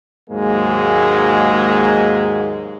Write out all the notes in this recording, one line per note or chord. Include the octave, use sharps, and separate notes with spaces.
D#2 G#2 F#3 G#3 A#3